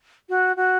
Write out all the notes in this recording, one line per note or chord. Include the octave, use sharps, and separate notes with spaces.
F#4
F#4